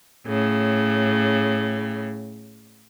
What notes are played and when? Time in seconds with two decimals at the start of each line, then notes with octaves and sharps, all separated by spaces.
0.25 A2 C#3